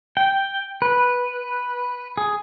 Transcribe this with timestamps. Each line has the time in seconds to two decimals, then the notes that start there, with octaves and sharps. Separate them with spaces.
0.17 G5
0.82 B4
2.18 G#4